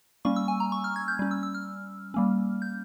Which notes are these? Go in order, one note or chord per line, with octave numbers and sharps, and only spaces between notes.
G3 A#3 C#4 C#6
E6
G#5
A#5
C#6
F6
G#6
G6
G3 C#4
E6
E6
F6
G3 A#3 C#4
G6